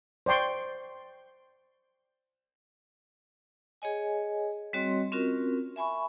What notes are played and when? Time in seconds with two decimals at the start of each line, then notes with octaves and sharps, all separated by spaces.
0.26 C5 D5 G5 C6 C#6
3.82 G#4 C#5 D#5 G#5
4.73 G3 C4 F#4 C#5 D#5 C6
5.12 C4 C#4 F4 F#4 A#4
5.76 E5 G#5 B5 C#6